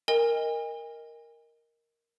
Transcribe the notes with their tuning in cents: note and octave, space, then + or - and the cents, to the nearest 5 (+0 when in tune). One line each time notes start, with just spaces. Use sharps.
A#4 +0 D#5 +5 G#5 -40